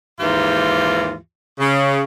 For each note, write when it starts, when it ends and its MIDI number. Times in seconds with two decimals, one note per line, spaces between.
0.20 1.14 39
0.20 1.14 44
0.20 1.14 52
0.20 1.14 65
0.20 1.14 67
1.60 2.02 49